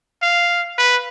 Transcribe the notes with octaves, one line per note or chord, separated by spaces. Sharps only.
F5
B4